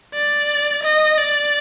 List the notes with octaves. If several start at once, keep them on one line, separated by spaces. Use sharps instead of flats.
D5
D#5
D5